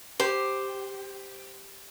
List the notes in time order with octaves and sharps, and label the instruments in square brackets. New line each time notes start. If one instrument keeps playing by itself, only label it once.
[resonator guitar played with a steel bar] G4 [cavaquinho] C5